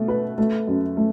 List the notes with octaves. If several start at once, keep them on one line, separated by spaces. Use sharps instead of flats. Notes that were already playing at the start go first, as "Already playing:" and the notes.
Already playing: B2 A3
B4
A3
F#2
A3